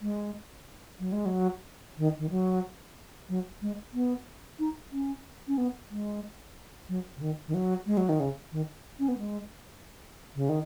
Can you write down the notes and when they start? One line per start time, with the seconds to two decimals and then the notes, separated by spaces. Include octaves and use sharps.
0.01 G#3
1.00 F#3
1.12 G#3
1.26 F#3
1.98 D#3
2.19 D#3
2.30 F#3
3.29 F#3
3.62 G#3
3.94 B3
4.59 D#4
4.92 C#4
5.48 C#4
5.58 B3
5.91 G#3
6.89 F#3
7.17 C#3
7.21 D#3
7.48 D#3
7.54 F#3
7.86 G#3
7.97 F#3
8.09 D#3
8.20 C#3
8.52 D#3
8.99 C#4
9.08 B3
9.18 G#3
10.35 C#3
10.49 D#3